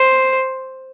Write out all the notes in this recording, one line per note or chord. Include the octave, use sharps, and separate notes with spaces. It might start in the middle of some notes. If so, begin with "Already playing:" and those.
Already playing: C5